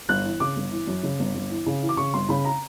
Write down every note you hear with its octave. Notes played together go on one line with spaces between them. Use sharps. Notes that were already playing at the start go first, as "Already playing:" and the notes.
G1 F#6
E3
C#3 D6
G1
E3
F#2
C#3
G1
G1
E3
C#3
E3
D6
C#3 C#6
G1 C6
C#3 B5
A#5